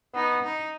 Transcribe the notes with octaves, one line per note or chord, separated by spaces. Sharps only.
B3 D#4
D#4